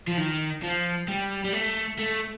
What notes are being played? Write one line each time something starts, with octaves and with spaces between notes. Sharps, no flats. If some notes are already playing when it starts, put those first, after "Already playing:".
F3
D#3
F3
G3
G3
A3
A3